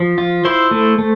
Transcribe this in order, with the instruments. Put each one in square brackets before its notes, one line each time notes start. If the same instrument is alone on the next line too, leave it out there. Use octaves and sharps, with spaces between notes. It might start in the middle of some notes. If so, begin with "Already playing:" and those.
Already playing: [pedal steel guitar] F3
F4
E4 C5 C6
A3
A3